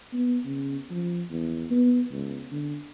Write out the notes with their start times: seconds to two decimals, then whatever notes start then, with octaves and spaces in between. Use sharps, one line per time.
0.13 B3
0.45 C#3
0.90 F3
1.30 E2
1.71 B3
2.11 C#2
2.52 D3